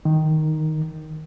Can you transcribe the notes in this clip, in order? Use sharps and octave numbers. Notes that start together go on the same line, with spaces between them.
D#3